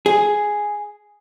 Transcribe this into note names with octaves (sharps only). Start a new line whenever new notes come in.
G#4